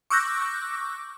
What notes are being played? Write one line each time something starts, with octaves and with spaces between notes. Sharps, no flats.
C#6 D6 E6 F#6 G6 A#6